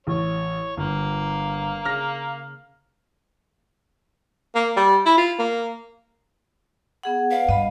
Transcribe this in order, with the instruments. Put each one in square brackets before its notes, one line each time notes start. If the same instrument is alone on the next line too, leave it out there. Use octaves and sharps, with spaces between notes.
[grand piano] A1 [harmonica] C#5
[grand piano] G1 [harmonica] A#3 F5
[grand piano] C#3 F6 A#6
[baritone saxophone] A#3
G3
E4
F4
A#3
[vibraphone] B3 G#4 F#5
[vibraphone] B4 D5 F#5 [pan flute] F5
[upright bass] G2 [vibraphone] D#5 B5